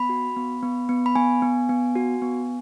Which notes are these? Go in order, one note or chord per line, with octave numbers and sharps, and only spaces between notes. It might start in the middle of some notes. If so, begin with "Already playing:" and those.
Already playing: B3 B5
F#4
B3
B3
B3
B5
B3 G#5
B3
B3
F#4
B3